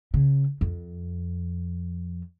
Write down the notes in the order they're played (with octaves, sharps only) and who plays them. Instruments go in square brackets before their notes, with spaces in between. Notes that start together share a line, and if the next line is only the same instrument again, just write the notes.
[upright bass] C#3
F2